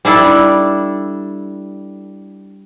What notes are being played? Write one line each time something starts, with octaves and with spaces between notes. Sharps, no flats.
G3 D4 E4 A4